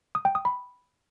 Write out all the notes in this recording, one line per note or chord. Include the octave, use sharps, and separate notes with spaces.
D#6
G5
D#6
B5